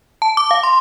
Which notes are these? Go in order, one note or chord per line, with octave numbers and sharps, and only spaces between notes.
A5
D6
F5
C6